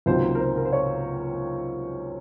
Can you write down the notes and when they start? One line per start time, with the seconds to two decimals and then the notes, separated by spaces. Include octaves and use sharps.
0.06 C#2 C3 D#3 F#3 A#3 C5
0.35 A#4
0.40 C5
0.57 A#4
0.65 C5
0.73 C#5